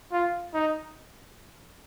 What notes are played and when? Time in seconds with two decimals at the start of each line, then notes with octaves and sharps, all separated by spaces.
0.12 F4
0.54 D#4